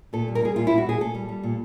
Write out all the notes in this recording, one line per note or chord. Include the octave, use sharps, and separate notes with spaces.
A#2 A4
G3
A#4
G3 G#4
A#2 F4
G3 E4
F#4
A#2 G#4
A#2 A4
G3
G3
A#2